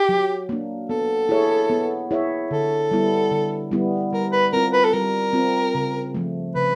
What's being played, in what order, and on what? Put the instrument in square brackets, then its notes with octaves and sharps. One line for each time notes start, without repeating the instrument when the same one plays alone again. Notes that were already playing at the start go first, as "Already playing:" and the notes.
Already playing: [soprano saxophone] G4
[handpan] F#3
A#3 D4
[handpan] B3 [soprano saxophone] A4
[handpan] E4 G#4 C#5 E5
B3
E4 G#4 C#5 E5
[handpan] D3 [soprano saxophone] A4
[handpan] G3 B3 E4
D3
G3 B3 E4
[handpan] G3 [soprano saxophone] A#4
[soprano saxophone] B4
[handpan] C4 F4 [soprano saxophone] A#4
[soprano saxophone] B4
A4
[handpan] G3 [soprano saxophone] A#4
[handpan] C4 F4
C#3
F3 A3
[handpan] C#3 [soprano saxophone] B4